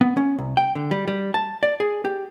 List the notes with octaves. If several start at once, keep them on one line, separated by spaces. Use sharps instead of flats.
B3
C#4
C2
G5
D3
G3
G3
A5
D5
G#4
G4